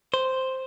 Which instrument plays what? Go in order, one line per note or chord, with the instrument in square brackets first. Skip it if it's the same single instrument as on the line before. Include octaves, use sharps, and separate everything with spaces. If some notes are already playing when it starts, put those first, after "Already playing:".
[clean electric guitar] C5